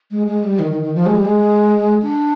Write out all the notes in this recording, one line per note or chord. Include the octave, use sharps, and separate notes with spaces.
G#3
G#3
G3
D#3
D#3
D#3
F3
G#3
G3
G#3
D4